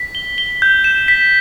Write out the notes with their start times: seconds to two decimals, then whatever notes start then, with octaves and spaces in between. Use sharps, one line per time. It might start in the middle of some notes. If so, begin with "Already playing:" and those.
Already playing: B6
0.15 G7
0.38 G7
0.62 G6
0.84 E7
1.08 B6